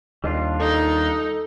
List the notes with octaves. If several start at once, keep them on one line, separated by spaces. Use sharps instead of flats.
D#2 G3 D4 F4 D#5
D#4 A4